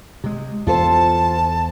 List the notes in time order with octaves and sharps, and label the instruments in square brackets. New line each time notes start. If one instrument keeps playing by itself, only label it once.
[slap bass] C3 G#3
[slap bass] E2 [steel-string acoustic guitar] F4 A4 C5 [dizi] A5